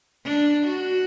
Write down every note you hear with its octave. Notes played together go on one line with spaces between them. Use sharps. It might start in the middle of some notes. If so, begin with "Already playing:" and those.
D4
F#4